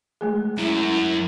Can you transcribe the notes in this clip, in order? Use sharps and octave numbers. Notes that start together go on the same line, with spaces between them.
G#3 A3 G#4
F#2 E4